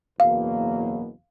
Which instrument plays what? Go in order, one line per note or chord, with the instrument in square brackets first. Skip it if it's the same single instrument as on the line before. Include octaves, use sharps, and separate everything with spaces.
[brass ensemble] F#1 E2 B2 F#3 A#3 [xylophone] F5